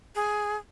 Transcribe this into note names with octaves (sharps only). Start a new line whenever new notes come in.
G#4